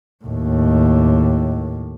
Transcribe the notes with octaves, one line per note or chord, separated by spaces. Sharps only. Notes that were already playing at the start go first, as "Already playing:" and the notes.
D#2 A2